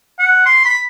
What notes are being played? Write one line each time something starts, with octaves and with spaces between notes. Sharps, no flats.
F#5
C6
B5